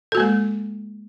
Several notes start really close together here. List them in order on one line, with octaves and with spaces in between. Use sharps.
A4 F#4 A#3 G#3